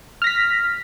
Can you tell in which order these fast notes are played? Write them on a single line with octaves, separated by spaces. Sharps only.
F6 A#6 B6